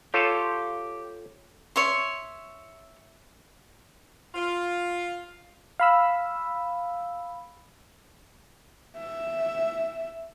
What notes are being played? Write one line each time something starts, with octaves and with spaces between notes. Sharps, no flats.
F4 G4 A4 C#5
C#5 E5 C6
F4
F5 B5 E6
E5